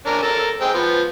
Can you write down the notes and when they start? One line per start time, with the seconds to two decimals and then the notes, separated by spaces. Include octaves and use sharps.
0.06 C#4 D4 A#4
0.23 A4 A#4 A5
0.61 G#3 C4 G5
0.74 F3 B3